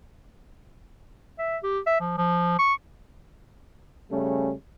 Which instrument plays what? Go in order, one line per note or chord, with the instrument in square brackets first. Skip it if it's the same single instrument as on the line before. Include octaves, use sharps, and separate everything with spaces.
[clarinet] E5
G4
E5
F3
F3
C#6
[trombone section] C#3 G3 A3 C#4